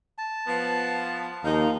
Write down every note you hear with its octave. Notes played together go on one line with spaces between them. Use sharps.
A5
F3 B3
D#2 F3 D#4 F5 A#5